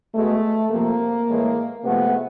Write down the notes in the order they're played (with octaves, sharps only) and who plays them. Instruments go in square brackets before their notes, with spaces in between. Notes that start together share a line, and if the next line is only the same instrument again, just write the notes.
[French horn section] B2 G#3 A3
C3 F3 A3 A#3
A2 E3 G#3
C3 F3 G#3 A3 B3